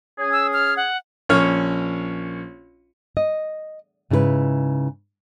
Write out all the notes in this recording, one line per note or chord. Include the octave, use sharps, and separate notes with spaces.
C#4 G#4
E6
F6
F#5
A#1 C#4 C#5 F6
D#5
G#2 C#3 E4 G#4 B4